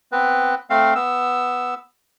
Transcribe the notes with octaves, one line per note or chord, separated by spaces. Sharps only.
B3 C4 B4
A3 C4 F5
B3 E6